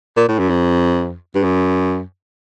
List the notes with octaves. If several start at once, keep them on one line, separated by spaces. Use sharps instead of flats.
A#2
A2
F#2
F2
G2
F#2